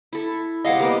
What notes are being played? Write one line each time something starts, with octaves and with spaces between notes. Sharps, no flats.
E4 A4
C3 G#3 G#4 D#5 F5 F#5
G3 A#3 B3